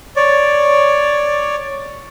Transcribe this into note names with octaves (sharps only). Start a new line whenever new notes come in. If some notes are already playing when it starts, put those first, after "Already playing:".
C#5 D5